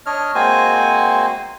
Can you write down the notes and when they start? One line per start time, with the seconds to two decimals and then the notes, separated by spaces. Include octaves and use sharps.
0.06 D4 C#5 D#5 F6
0.35 G#3 A#3 C4 F#4 C5 G#5